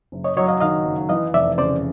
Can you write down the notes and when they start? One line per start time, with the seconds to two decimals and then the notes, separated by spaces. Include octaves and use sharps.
0.12 F#1
0.24 C#5 D#5
0.36 F#3 C#5 D#5
0.48 D#5 F5
0.60 D#3 D#5 F5
0.85 F#1
1.09 E3 D#5 F5
1.33 F1 D5 E5
1.58 C#3 C5 D5